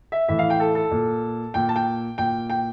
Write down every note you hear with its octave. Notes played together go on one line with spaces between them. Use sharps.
E5
A2 E3 E5
F5
G5
A4
A4
A#2
A#2 G5
A5
G5
A#2 G5
G5